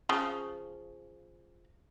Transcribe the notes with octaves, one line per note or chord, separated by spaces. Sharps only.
C#3 F3